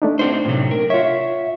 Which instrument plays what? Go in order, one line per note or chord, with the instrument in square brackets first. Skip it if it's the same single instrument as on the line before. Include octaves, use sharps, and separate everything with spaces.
[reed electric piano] A3 D4 D#4
[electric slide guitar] C4 F#4 C5
A2 C3 F#3
A#4
[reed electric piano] F4 C#5 [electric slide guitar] E5 F#5